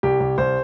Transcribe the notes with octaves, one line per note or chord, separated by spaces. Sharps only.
C2 G4
C2
C2 C5